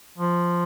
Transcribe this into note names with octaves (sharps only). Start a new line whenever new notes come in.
F3